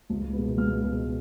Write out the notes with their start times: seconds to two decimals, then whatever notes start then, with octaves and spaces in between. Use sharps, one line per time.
0.10 C#2
0.33 B2 G#3 B3
0.57 C#2 F6
0.81 B2 G#3 B3